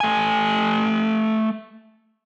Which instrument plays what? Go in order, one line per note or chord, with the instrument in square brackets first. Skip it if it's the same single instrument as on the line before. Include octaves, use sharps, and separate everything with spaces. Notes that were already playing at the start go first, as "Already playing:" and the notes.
[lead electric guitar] A3 G#5